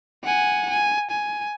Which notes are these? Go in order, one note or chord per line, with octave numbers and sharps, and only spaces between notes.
F#5 G#5
G#5
G#5